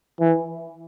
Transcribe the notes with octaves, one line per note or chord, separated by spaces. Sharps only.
E3